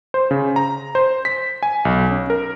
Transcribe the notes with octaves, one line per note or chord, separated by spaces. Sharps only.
C5
C#3
A#5
C5
B6
G#5
B1
C#4
A#4